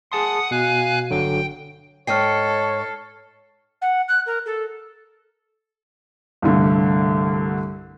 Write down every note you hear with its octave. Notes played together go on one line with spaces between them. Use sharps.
G#4 F#5 A5 C6 D#6
B2 F5 G#5 F#6
G1 D3 F#3 G5
G#2 A4 C#5 D#5 G5 F6 C7
F#5
F#6
A#4
A4
C2 G2 D3 A3